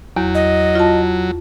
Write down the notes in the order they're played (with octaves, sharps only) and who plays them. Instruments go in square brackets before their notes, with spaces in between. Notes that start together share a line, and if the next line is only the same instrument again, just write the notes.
[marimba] E2 [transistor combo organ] F#3
[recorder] D#5
[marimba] F4 A5